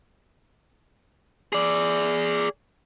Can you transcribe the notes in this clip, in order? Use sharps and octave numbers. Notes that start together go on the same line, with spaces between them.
G#4 D5